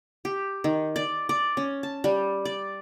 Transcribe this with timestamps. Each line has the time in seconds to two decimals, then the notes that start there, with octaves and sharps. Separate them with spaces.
0.25 G4
0.64 D#3
0.96 D5
1.29 D5
1.57 C#4
1.83 A5
2.04 G3
2.45 D5